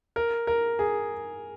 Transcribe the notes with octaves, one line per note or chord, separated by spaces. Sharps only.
A#4
A#4
G#4